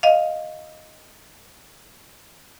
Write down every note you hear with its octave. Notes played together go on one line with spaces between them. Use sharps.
D#5 F5